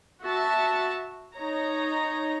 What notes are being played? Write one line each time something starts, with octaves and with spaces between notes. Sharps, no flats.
F#4 E5 A5
D#4 C#5 A#5